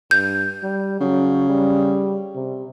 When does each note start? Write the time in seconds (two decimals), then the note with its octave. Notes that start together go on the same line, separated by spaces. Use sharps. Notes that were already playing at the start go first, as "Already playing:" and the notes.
0.11 G2 G6
0.64 G3
1.01 C#3 F#3
1.50 G3
2.35 C3